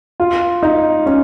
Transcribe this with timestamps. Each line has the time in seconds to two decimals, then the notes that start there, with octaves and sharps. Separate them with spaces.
0.20 F4
0.63 D#4
1.06 C#4